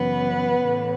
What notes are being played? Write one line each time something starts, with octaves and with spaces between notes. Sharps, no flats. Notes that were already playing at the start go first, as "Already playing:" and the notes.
Already playing: F#2 C#3 E3 B3 B4
A2 E3